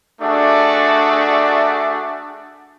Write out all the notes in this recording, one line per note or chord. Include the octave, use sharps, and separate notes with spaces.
A3 D4 F#4 G#4 D5 E5